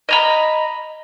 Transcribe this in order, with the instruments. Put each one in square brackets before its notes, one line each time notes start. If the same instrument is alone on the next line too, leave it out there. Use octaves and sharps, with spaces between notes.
[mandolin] D#5 A#5 B5